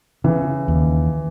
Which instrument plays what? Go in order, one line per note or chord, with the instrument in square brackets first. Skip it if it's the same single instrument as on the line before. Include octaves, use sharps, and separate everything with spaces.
[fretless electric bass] C#3 [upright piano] E3
[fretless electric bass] D#2